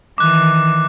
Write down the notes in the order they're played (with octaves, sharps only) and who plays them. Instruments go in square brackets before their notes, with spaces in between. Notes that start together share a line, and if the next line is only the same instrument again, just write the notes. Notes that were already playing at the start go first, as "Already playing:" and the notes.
[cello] D#3 E3 [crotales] D6 F#6